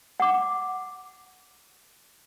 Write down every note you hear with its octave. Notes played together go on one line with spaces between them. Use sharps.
F#5 D6